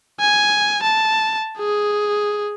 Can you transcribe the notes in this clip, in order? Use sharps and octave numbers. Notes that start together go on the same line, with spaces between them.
G#5
A5
G#4